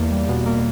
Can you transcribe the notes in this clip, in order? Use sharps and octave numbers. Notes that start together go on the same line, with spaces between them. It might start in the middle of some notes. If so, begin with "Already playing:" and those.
Already playing: E2 A#3 D5
G3
B2
A#3